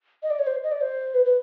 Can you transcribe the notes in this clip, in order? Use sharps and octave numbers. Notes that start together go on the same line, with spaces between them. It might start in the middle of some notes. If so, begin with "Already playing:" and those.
D#5
D5
C#5
C5
D#5
D5
C5
B4
B4